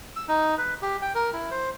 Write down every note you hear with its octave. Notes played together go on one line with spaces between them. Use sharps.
E6
D#4
B4
G4
G5
A#4
E4
C5